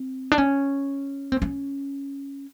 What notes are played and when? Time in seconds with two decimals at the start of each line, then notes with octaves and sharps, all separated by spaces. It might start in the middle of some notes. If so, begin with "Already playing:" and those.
Already playing: C4
0.32 D4
0.38 C#4
1.32 C4
1.42 C#4